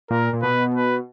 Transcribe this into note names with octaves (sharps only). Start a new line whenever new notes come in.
A#2 A#4
A#2
B2 B4
B4